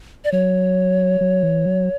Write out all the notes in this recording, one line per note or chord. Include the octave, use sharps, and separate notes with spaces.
D5
F#3 C#5
F#3
E3
F#3